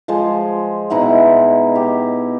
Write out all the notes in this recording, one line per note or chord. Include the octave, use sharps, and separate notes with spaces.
F3 G#3 C5
B2 D#4 E4 F#5
G4